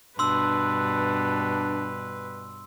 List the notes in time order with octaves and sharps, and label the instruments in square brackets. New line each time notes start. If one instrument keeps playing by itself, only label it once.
[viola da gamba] G2 B2 [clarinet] D4 [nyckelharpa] B4 [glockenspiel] C6 E6